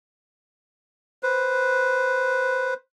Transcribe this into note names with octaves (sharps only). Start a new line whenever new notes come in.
B4 C5